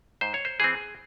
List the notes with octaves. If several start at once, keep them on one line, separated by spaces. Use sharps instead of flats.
G#2 C5
C#5
C5
E3 C4 G#4